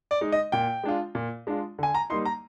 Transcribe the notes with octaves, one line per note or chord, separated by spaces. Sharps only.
D5
G#3 D#4
D#5
A#2 G5
G#3 D4 F4
A#2
G#3 D4 F4
D3 G#5
A#5
G3 A#3 D#4 C6
A#5